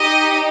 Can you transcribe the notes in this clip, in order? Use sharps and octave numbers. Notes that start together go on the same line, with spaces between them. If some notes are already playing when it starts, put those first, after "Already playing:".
Already playing: D#4 G4 D#5